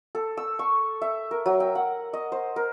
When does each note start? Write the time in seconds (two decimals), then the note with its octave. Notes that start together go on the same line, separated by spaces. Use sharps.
0.15 A4
0.37 E6
0.59 C#6
1.02 E5
1.31 A#4
1.46 F#3
1.60 G5
1.75 F#5
2.13 D#5
2.32 C5
2.56 A#4